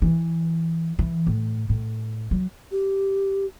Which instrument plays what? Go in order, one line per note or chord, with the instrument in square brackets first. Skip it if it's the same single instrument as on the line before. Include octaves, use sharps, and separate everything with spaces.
[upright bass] E3
E3
A2
A2
F#3
[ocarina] G4